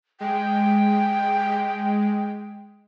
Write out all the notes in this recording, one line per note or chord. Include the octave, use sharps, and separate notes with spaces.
G#3 G5